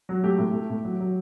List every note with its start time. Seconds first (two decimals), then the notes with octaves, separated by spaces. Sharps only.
0.09 F#3
0.23 A3 G4
0.38 A2
0.53 A3
0.70 A2
0.84 F#3
1.00 F#3